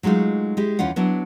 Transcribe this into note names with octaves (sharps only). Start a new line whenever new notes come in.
F#3 G#3 A3 D#4 F4
G#3 E4 G4
D#2 E3 C#4 F4 F#5
F#3 B3 D4 E4